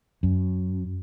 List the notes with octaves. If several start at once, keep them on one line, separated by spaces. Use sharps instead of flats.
F#2